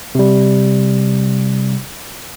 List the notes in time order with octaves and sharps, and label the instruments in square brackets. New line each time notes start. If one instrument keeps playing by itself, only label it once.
[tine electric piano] C3 G3